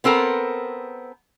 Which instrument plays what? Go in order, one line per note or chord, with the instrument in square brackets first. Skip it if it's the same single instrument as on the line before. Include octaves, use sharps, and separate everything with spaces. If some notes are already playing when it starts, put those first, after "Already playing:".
[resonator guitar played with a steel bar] B3 C4 A4 A#4